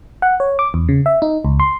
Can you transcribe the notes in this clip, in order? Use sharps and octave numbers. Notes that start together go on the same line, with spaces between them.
F#5
C#5
D6
E2
C#3
E5
D#4
C#2
C6